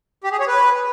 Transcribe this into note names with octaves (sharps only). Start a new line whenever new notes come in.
G4
G#4
C#5
B4